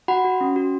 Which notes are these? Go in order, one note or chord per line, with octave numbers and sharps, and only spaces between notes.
F#4 F#5 B5
F#4
C#4
F#4